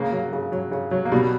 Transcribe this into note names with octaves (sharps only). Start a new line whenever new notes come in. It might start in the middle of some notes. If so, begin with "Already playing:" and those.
Already playing: C#3 A#3
F#3
C#3
F#3
C#3
F#3
A#3
B2 G3